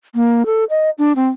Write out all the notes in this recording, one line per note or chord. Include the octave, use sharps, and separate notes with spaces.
A#3
A4
D#5
D4
C4